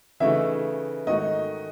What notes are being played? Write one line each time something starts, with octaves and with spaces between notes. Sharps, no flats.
C#3 E3 A3 D#4 F#4 E5
G#2 D#3 A3 D#4 F#4 D#5